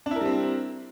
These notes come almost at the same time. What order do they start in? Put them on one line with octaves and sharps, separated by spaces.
D4 E4 A#4 G3 C4